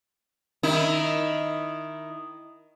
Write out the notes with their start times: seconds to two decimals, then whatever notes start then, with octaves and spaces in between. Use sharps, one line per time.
0.63 D#3 D#4 E4